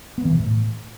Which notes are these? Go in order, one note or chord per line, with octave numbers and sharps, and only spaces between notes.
B3
E3
B2
A2